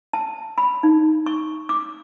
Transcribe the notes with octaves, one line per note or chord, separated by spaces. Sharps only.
A5
B5
D#4
C#6
D6